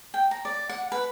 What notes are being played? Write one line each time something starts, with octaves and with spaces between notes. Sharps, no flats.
G5
A#5
D5
F#5
B4